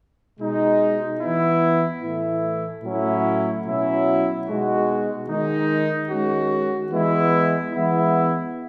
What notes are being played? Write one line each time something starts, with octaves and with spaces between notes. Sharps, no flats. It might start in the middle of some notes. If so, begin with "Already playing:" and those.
B2 G#3 D#4
E3 B3 E4
A2 E3 A3 E4
A2 F#3 A3 C#4 E4
B2 F#3 C#4 E4
B2 G#3 D#4 F#4
D#3 G#3 D#4
D#3 G#3 C#4 F#4
E3 G#3 B3 E4
E3 G#3 B3 E4